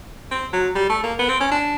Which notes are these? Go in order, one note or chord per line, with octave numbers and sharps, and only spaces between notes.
C4
F#3
G3
A3
A#3
B3
C4
C#4
D4